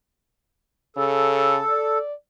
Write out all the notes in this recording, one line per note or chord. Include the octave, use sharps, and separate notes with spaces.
C#3 A4
D5